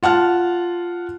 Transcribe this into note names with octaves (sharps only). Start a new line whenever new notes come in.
F4 F#5 A5 F6